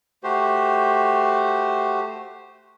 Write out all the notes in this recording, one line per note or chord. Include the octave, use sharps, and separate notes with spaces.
A3 F#4 G4 C5